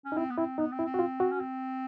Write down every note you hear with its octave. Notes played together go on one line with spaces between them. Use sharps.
C#4
D#4
C4 E4
B3
C4 E4
B3 D#4
C4
E4
C4
F#4
F4
F#4
C#4
C4